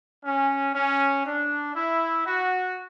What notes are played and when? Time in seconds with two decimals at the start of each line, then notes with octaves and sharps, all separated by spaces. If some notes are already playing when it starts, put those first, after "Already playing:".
0.25 C#4
0.75 C#4
1.26 D4
1.76 E4
2.26 F#4